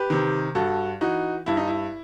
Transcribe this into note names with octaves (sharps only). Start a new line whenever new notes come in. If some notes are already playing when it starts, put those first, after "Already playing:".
Already playing: G4 B4
C3 D#3
G2 F#4 A4
E3 D#4 F#4
G2 E4
D#4
E4